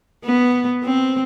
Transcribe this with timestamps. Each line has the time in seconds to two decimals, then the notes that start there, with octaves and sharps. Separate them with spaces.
0.25 B3
0.84 C4